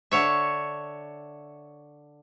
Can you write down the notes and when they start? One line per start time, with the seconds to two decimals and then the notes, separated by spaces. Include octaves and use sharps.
0.11 D3 C#5 E5